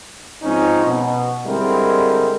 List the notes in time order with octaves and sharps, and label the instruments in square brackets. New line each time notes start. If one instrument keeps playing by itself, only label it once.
[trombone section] G#2 F3 C4 C#4 D#4
B2
D3 G3 G#3 C4 E4 A#4